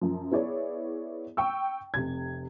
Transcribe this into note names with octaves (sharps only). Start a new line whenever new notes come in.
F#2 F3
B3 E4 G#4 C#5 D5
G5 C#6 E6
F1 C3 G#6